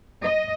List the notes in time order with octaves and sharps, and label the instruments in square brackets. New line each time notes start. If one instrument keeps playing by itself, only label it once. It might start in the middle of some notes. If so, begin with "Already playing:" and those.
[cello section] D#5